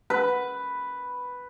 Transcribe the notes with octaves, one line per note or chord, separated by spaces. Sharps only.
B4